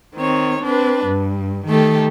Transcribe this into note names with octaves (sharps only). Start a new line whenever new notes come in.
D#3 C4 C#5
C4 D4 B4
G2
D#3 A3 G4 A4